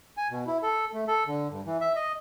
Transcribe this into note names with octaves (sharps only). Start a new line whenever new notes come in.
G#5
B2
E4
A4
A3
A4
D3
G2
E3
E5
D#5